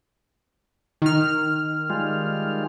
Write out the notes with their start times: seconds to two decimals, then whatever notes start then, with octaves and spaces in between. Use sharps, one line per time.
1.02 D#3 F6
1.90 G3 G#3 F4